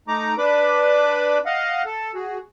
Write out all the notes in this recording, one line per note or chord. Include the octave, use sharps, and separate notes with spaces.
A3 D#4 A#5 D6
D4 B4 B5 D6
D#5 F5 F#5
A4
F#4 G#4